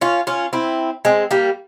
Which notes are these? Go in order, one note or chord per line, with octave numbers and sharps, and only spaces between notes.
C#4 F4
C#4 F4
C4 E4
G#3 C4
G3 A#3